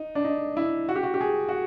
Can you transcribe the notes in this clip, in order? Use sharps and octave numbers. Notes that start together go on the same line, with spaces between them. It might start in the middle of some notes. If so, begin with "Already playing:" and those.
Already playing: D#4
D4
D#4
E4
F#4
G4
F#4
G4
G#4
F#4